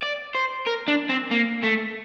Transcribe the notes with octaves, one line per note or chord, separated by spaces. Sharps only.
D5
C5
A#4
D4
C4
A#3
A3